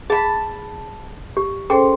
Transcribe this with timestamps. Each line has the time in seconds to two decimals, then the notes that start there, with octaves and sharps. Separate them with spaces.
0.10 G#4 A5 B5
1.37 G4
1.70 C#4 G#4 A4 C5 G5 C6